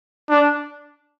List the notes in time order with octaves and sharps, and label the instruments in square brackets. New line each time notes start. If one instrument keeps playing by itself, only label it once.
[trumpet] D4